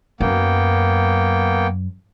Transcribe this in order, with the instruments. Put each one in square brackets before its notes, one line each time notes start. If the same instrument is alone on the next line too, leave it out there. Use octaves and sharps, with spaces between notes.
[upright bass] F#2 [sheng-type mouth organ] A#3 B3 G5